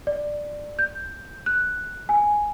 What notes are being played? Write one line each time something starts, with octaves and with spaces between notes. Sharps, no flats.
D5
G6
F#6
G#5